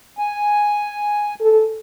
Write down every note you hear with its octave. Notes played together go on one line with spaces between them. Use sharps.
G#5
A4